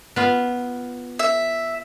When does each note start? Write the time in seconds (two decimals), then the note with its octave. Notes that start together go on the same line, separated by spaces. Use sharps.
0.16 B3 F4
1.19 E5